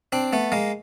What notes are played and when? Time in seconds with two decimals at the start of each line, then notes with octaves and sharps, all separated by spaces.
0.12 C4 D4
0.33 A3 B3
0.52 G#3 A#3